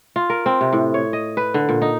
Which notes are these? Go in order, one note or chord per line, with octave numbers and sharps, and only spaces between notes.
F4
A#4
C4
C3
A2
C#5
D#5
B4
D3
A#2
D#4